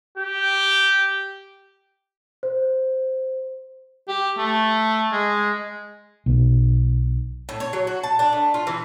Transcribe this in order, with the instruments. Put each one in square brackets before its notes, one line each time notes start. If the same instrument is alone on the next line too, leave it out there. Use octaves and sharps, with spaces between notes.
[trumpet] G4
[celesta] C5
[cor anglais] G4
A3
G#3
[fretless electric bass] B1
[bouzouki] A2
C#5
F#3
F#4
A5
D4
A3
F4
E3